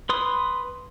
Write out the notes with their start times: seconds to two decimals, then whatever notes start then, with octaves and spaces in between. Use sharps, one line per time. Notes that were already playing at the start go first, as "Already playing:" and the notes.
0.09 B4 C6 D#6